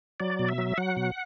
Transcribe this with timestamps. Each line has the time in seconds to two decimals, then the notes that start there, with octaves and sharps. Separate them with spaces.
0.20 F#3 D5
0.39 B2
0.49 E5
0.58 F#3
0.78 F#3 F#5
0.97 B2